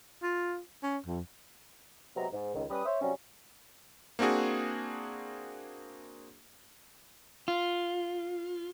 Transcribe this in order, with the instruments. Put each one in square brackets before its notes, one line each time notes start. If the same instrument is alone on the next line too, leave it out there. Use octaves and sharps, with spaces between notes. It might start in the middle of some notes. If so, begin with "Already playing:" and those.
[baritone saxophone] F4
C#4
F2
[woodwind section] C3 F#3 G#3 B3 C4 A#5
G#2
C#2 D#3
G3 C#4 B4 B5 D#6
C5 C#5 E5
C3 F#3 G3 C#4
[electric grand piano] A#3 C4 D4 F#4 G#4
[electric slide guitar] F4